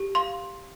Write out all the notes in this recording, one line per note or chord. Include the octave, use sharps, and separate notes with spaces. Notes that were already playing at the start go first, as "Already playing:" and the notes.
Already playing: G4
F5 C6